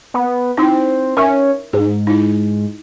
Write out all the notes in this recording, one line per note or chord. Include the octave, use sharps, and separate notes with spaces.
B3
C4 D#4 E4
C#4 A#4 E5
G#2 G#4
D#4 E4